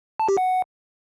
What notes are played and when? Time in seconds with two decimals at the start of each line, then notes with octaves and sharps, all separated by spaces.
0.20 A5
0.28 G4
0.37 F#5